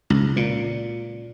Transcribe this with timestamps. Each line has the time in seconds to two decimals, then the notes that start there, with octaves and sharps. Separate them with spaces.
0.10 C#2
0.36 A#2